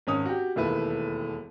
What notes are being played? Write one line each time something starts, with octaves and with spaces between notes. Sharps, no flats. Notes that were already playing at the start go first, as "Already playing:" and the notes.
G#1 C#4 D#6
F#4 G4
E1 D#2 A3 E4 B4